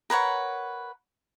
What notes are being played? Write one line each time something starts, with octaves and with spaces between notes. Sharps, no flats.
A#4 B4 C#5 F#5